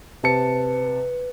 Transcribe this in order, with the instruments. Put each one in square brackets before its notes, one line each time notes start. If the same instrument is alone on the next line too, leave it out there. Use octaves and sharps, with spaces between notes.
[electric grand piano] C3 A5 C#7 [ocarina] B4